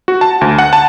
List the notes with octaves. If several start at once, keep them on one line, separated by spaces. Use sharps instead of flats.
F#4
A5
D2
F#5
A5